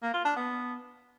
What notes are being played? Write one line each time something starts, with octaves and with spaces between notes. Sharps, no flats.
A#3
F4
D4
B3